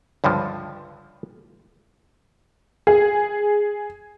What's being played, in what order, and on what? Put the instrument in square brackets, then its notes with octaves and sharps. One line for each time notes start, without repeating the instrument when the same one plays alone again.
[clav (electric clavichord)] C#2 G2 D3 F3
[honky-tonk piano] G#4